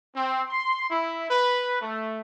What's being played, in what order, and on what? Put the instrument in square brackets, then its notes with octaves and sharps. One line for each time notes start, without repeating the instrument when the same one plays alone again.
[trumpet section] C4
C6
E4
B4
A3